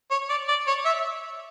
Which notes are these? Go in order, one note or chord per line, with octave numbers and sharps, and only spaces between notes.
C#5
D5
D5
C#5
E5